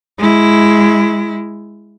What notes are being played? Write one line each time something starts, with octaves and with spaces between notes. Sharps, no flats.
G#3 E4